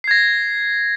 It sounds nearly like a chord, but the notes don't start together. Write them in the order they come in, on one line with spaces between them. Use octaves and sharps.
C7 G#6 A#6